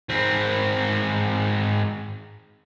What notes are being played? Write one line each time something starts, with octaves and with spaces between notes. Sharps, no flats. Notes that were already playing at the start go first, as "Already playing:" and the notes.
G#2 C4